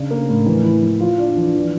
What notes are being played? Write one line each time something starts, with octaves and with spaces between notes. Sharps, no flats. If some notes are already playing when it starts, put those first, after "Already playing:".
Already playing: C#3 D4
A#3
A2
E3
E4
E3
F4
D4
E3
E3